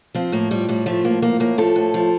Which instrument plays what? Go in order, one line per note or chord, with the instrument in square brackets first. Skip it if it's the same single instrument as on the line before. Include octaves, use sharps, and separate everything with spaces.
[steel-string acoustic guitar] F3 C4
A2 A#3
F3 G3
A2 G3
F3 A3
A2 A#3
F3 A#3
A2 A#3
F3 A4
A2
F3